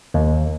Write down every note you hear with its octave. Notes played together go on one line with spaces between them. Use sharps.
D#2